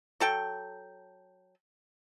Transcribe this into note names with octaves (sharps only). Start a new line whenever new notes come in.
F#3 A4 G5